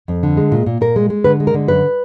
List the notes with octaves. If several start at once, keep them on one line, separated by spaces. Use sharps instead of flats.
F2
D3
G#3
A#2
A#2
A#2 A#4
G#3
G#3
D3 B4
G#3
A#4
D3
F#2 B4